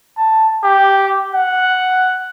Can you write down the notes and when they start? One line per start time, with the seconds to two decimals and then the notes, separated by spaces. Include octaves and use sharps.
0.17 A5
0.63 G4
1.33 F#5